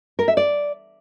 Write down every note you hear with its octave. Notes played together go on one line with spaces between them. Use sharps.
A#4
E5
D5